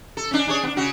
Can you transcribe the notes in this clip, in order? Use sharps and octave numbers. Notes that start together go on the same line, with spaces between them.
A4
C#4 D4
D4 G#4 C#5
B3 D4
C#3 F#4